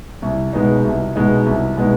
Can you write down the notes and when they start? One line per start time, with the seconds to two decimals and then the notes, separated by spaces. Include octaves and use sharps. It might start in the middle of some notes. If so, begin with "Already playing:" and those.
0.22 C2
0.53 B2 G#3 B3 D#4
0.84 C2
1.16 B2 G#3 B3 D#4
1.46 C2
1.77 B2 G#3 B3 D#4